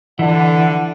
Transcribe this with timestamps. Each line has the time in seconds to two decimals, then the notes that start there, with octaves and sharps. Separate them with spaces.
0.19 D3 E3 F#5